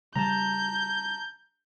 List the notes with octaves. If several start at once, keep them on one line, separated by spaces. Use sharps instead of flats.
C#3 G3 A5 A#5 G6